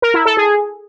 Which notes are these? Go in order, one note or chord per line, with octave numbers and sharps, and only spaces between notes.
A#4
E4
A4
G#4